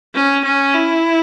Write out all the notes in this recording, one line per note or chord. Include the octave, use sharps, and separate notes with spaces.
C#4
C#4
E4